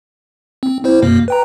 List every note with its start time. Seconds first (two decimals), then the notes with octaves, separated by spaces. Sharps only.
0.63 C4
0.84 C4 E4 C5
1.02 F#2 B2 A#3
1.28 B4 G5 A#5